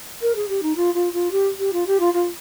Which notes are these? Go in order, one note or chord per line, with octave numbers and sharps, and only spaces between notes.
A#4
G#4
G4
D#4
F4
F4
F4
G4
G4
F4
G4
F4
F4